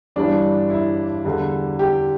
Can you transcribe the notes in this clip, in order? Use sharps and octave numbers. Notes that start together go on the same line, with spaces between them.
G1 G2 E3 G3 D4
E4
E2 D3 G3
G4